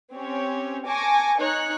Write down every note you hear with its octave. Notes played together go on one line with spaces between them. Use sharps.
C4 C#4 G4 C#5
G#5 A5 C#6 D6 A#6
D#4 C#5 F#6 C#7